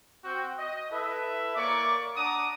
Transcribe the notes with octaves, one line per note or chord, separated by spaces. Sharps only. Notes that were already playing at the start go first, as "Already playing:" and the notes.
C4 F#4 G5
D#5
E4 A4 B4 E5
A#3 A#4 C#5 D5 C#6 D6
D4 F#5 A#5 D6 D#6